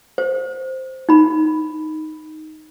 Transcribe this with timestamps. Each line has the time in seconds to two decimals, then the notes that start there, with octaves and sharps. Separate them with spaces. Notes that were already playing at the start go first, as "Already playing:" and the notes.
0.18 C5
1.09 D#4 B5